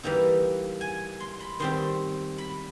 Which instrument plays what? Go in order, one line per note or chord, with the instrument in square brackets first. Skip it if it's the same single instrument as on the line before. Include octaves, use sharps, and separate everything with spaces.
[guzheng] E3 G3 A#3 D#4
G#5
C6
B5
D#3 G3 C4 C6
B5